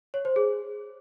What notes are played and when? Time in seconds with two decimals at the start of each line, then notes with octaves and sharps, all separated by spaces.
0.14 C#5
0.25 C5
0.36 G#4